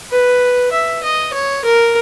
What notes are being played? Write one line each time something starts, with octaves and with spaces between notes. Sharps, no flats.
B4
E5
D#5
C#5
A#4